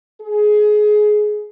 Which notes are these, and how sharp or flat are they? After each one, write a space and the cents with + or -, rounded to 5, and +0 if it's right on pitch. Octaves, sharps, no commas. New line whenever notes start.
G#4 +20